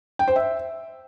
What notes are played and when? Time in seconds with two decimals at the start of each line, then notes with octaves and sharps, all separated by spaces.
0.19 G5
0.28 C5
0.36 E5